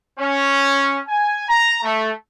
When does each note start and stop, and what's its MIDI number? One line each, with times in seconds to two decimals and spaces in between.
0.19 0.99 61
1.08 1.44 80
1.48 1.79 82
1.83 2.11 57